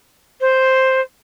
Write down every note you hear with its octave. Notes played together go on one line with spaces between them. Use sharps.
C5